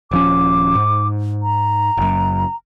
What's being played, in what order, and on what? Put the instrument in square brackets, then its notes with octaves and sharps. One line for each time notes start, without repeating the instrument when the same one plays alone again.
[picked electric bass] D#1 F3 C#4 [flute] D6
[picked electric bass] G#2
[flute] A#5
[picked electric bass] F#1 F#2